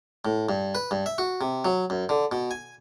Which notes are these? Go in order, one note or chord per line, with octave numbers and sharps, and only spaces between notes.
A2
G2
B4
G2
E5
F#4
C3
F#3
F#2
D3
B2
G#5